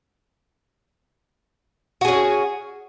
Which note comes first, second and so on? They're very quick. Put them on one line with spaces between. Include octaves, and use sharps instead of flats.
F#4 G#4 C#4